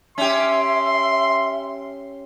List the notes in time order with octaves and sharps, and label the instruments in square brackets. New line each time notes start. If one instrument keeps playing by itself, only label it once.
[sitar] C#4 G4 [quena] E5 [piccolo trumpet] C6